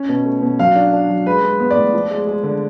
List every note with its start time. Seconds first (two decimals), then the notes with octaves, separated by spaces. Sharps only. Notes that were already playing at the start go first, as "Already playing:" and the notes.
Already playing: C#4
0.09 B2
0.25 A3
0.42 B2
0.59 F#3 F5
0.75 D4
0.93 D4
1.09 F#3
1.26 G#3 B4
1.43 G#3
1.59 B3
1.71 D5
1.77 A2
1.94 F3
2.11 G#3
2.27 G#3
2.44 D3